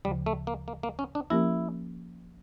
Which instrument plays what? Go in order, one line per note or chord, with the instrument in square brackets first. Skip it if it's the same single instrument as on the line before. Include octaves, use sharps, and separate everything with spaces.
[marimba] D2 C#3 F3 [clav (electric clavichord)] G3
[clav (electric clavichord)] A3
A#3
A#3
A#3
C#4
D4
[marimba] F3 A#3 C#4 G4 A#4 [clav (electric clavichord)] E4